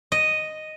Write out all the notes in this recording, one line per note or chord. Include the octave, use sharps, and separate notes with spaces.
D#5